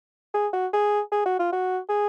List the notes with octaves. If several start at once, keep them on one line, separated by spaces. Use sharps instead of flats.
G#4
F#4
G#4
G#4
F#4
F4
F#4
G#4